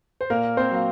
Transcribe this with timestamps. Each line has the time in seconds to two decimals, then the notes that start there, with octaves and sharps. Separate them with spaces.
0.21 C5
0.30 A#2 A#3 A#4
0.57 C4 C5
0.71 F#3 A#3